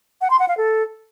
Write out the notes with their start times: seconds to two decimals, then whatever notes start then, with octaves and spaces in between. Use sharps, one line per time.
0.21 F#5
0.30 C6
0.39 F#5
0.48 F5
0.57 A4